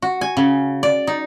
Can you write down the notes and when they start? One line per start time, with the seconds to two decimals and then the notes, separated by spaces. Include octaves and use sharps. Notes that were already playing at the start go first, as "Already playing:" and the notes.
0.02 F#4
0.21 G#5
0.37 C#3
0.83 D5
1.07 D#4